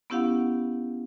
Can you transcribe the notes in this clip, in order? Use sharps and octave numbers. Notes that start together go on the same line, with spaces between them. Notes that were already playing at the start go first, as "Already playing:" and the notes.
B3 C#4 E4 G4 F5 F#5